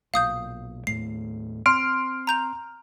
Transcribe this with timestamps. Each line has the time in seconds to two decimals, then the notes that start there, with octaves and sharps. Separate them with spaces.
0.14 B1 A#2 F5 D#6 G6
0.87 D#2 A2 A3 C7
1.66 C4 C6 F6 D7
2.27 A#5 G6 F7